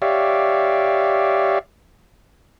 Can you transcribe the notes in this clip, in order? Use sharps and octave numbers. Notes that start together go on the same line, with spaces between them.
G4 C#5 D5 E5 F5